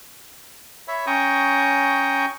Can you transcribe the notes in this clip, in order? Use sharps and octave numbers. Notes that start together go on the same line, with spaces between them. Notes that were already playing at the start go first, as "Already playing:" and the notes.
C#5 E5 B5
C#4 G5 A#5 C#6 D#6